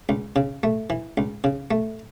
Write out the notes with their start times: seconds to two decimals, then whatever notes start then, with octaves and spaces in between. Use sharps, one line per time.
0.09 C#2
0.36 C#3
0.63 A3
0.90 E3
1.18 C#2
1.44 C#3
1.71 A3